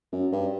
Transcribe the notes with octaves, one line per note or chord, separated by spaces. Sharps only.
F#2
G2